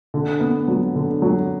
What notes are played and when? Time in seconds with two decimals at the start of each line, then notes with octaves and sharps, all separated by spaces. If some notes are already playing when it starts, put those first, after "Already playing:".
0.14 D3
0.40 B3
0.68 F#3
0.95 D3
1.22 F#3